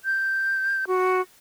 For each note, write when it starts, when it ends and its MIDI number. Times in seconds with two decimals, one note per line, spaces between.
0.05 0.85 91
0.87 1.21 66